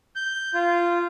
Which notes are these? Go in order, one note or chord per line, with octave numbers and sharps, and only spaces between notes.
G6
F4